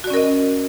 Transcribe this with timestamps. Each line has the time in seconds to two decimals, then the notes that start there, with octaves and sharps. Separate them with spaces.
0.04 F#4
0.07 D5
0.10 C#4
0.14 A#4
0.17 D#5